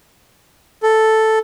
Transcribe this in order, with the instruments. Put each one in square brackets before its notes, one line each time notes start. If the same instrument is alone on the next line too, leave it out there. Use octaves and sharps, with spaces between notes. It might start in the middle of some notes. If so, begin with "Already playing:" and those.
[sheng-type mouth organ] A4